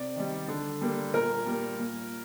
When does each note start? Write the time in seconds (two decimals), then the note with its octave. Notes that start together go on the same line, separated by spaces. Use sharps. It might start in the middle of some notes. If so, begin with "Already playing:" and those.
Already playing: C3 D5
0.16 D#3 G3
0.48 D3
0.81 G3 A#3
1.14 A#2 A#4
1.46 G3 A#3
1.79 A#2